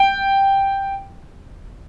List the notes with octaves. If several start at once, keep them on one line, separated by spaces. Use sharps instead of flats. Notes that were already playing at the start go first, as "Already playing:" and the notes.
Already playing: G5